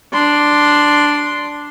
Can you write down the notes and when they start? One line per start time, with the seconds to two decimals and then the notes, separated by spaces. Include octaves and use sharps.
0.13 D4 C6